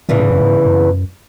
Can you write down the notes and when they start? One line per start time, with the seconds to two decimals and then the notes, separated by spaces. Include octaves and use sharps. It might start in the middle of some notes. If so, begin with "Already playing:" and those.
0.09 E2 A2 C#3 E3
0.20 G#2
0.30 F#2
0.40 G#2
0.65 F#2